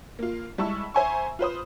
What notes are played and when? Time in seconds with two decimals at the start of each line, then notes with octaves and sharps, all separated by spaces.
0.19 A#3 F4
0.58 G3 G#3 E4 A5 C#6 E6
0.94 C5 E5 G#5 A#5 C#6
1.39 F4 B4 C5 D#6